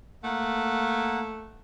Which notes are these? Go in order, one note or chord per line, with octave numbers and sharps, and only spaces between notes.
A3 A#3 F#5